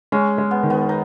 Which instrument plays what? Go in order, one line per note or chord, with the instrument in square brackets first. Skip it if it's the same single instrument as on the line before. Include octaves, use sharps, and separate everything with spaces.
[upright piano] G#3 [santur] C#4
[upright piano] G#3
[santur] B3
[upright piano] D#3
[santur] B3
D#4